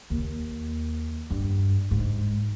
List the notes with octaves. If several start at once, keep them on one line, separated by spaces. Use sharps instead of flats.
D#2
G2
G#2